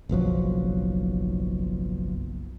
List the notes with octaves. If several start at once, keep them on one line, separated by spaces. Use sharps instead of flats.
F#1 B1 F3 F#3